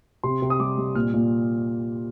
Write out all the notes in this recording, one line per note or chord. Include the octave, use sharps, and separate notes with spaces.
C3 C6
C3
D#6
G3 D6
G3
A#2 F6
A#2